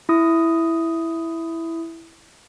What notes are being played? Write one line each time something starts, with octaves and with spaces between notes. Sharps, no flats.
E4 D#6